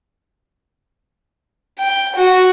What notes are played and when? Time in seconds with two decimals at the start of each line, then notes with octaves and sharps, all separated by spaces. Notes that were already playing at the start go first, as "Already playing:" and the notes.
1.80 G5
2.17 F#4